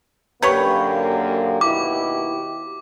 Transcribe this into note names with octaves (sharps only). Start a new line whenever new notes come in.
F#2 D3 A#3 G4 B4 C#5 G5
D#2 B2 E4 D6